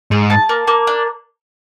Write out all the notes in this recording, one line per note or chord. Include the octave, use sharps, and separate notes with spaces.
G#2 G#4
A5
A#3
A#3
D4